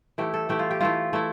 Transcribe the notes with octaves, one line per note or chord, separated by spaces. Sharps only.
E3 A3 E4 G4
A4
E3 A3 E4 G4
F4
G4
E3 A3 E4 F4
E3 A3 E4